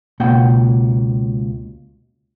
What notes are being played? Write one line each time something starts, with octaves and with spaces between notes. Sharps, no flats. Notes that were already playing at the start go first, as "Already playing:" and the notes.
C#2 B2 A#3 F#5 G5